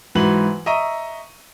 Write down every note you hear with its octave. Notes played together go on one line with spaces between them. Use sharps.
G#2 E3 F#3 F#4 B4 F#7
D#5 E5 A#5 C#6 D#7